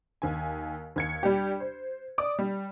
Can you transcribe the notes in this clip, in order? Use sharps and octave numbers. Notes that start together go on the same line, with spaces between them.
D#2 G#5
D#2 G#6 C#7
G3 D4 G4
C5
D5 D6 D#6
G3